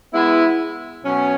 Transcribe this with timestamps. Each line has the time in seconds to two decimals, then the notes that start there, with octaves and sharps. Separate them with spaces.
0.13 G#3 B3 E4
1.04 B2 F#3 C#4